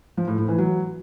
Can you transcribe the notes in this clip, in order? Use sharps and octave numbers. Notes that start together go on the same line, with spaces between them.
F3
A2
A2
E3
F#3